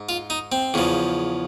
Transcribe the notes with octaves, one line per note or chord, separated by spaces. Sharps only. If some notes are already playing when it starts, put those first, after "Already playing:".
Already playing: G#2
F4
D#4
C4
E2 C#3 F3